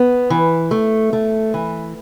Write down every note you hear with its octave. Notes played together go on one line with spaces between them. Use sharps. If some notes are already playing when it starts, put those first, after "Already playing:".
Already playing: B3
E3
A3
A3
E3